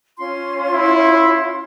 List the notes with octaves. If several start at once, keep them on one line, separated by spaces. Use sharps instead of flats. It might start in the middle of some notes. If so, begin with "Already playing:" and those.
C#4 F4 C6
E4